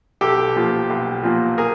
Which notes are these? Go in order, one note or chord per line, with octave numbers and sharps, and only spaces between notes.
B1 G4 A4
A#2 F3
B1
A#2 F3
G#4 A#4